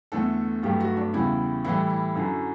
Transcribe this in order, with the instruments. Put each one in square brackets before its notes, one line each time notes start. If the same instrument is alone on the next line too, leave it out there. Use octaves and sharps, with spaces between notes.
[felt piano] E2 D3 A3 A4
G2 F#3 A3 G4
F#4
D4
E2 C#3 G3 E4
A2 E3 G3 E4
E4
F#2 D3 F#3